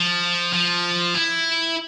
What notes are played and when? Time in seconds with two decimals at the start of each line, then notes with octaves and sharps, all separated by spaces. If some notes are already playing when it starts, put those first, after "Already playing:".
Already playing: F3
0.54 F3
1.15 E4